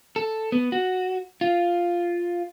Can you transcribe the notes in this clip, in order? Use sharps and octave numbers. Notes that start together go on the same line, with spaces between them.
A4
B3
F#4
F4